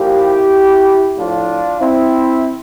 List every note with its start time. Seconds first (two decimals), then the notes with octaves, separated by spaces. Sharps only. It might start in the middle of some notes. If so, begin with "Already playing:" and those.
Already playing: A#2 F3 E4 G4
1.17 A2 F3 D4 F4
1.80 C4 E4